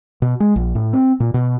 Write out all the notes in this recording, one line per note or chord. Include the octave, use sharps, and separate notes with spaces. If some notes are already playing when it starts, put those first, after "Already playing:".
B2
G#3
A#1
A2
C4
A#2
B2